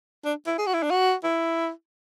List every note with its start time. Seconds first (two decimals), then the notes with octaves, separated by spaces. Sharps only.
0.25 D4
0.47 E4
0.58 G#4
0.66 F#4
0.74 E4
0.83 D4
0.91 F#4
1.23 E4